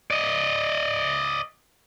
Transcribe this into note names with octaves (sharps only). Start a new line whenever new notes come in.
D5 D#5